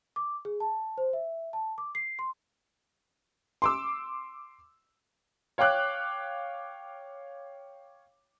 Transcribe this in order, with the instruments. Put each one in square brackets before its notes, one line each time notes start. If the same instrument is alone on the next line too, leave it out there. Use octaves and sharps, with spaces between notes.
[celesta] D6
G#4
A5
C5
E5
A5
D6
C7
C6
[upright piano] C6 D6 E6
C#5 F5 G5 D6 F#6